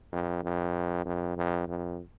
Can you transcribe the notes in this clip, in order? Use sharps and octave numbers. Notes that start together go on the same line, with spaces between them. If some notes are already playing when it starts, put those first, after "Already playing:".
F2
F2
F2
F2
F2